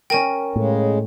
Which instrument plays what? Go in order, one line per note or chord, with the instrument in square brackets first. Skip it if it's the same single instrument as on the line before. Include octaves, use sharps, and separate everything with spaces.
[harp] C#4 A#4 [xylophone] G5 G#5
[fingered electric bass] A2 [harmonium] C#3 G#3